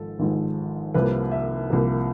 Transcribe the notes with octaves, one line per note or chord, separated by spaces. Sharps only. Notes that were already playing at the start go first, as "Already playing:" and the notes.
Already playing: G#1 G#2 F3 A4
G#1 G#2 F3 G#3
C2 C3 F3 A#3 B4
E5
C2 C3 F3 A#3